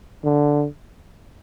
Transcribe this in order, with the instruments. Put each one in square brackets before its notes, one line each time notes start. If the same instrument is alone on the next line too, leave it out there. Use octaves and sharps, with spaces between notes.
[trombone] D3